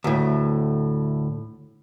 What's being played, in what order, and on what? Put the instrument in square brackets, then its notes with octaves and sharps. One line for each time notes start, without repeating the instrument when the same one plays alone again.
[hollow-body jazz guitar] D2 A2